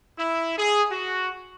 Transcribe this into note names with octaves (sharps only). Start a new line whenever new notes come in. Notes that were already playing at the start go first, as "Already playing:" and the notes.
E4
G#4
F#4